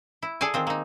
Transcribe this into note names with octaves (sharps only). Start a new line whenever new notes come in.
E4
G#4 A4 D5 G#5
D#3 C4 F4
A#3 D#4